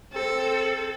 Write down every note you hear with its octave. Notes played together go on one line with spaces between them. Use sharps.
C4 A4